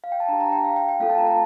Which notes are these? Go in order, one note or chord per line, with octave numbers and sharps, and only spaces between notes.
F5
G5
A5
D4 G4 A#5
A#5
G5
F5
G5
G5
A3 C4 F4 A4 F5
A5
A#5
A5